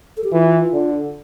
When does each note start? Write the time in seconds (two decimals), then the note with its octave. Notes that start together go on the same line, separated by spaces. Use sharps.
0.17 A4
0.24 G4
0.32 E3 F4
0.73 D3